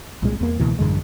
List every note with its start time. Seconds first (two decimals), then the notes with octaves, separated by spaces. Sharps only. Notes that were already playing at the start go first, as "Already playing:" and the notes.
0.22 C2 A#2 G#3
0.41 E2 A#3
0.59 C#2 B2 E3
0.79 A1 F#2 D3 G#3